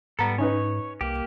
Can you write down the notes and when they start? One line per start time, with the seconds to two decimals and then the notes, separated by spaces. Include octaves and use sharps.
0.19 G#2 G3 B3 A4 A#5
0.38 C#4 D#4 B4 C#5
1.01 C2 A#3 G4